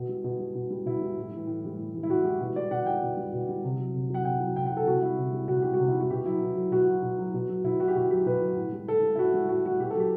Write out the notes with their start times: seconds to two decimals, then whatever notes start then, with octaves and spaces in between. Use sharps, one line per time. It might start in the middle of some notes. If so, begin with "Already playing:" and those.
Already playing: B2
0.09 G3
0.24 B2
0.39 G3
0.55 B2
0.71 G3
0.85 B2 E4
1.01 G3
1.17 A2
1.32 E3 G3
1.47 A2
1.63 E3 G3
1.78 A2
1.94 E3 G3
2.03 E4
2.09 A2 F#4
2.24 E3 G3 G4
2.41 B2
2.55 G3 D5
2.71 B2 F#5
2.86 G3 G5
3.02 B2
3.17 G3
3.33 B2
3.49 G3
3.64 C3
3.79 F#3
3.94 C3
4.10 F#3 F#5
4.25 C3 G5
4.40 F#3
4.56 C3 G5
4.66 F#5
4.71 F#3
4.77 A4
4.86 C3 F#4
5.02 G3 E4
5.18 C3
5.33 G3
5.48 C3 F#4
5.62 G3 G4
5.73 F#4
5.79 C3
5.88 E4
5.94 G3
6.00 F#4
6.10 B2 G4
6.25 F#3 E4
6.41 B2
6.56 F#3
6.72 B2 F#4
6.87 F#3
7.02 B2
7.18 F#3
7.34 B2
7.49 F#3
7.64 B2 E4
7.80 F#3 F#4
7.88 G4
7.95 B2 F#4
8.11 F#3 G4
8.26 B2 B4
8.41 F#3
8.57 A2
8.72 G3
8.88 A2 A4
9.03 G3
9.15 E4
9.19 A2 F#4
9.34 G3
9.49 A2 F#4
9.65 G3 F#4
9.80 B2 G4
9.90 A4
9.95 F#3 G4